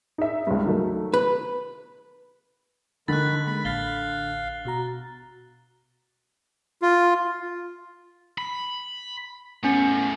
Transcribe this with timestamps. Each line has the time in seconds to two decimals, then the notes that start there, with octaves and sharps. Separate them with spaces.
0.18 D#4 E5
0.47 C#2 G2
0.64 D#3 F#3 A3
1.14 B4
3.08 D3 D#3 B5 F#6 A6
3.47 G#3 A#3 B5
3.65 A1 F5 A6 G7
4.65 B2 F#4 A#5
6.82 F4
8.38 B5
9.63 E2 A3 B3 C#4 C#7